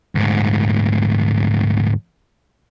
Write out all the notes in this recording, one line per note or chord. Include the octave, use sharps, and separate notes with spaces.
D2 G#2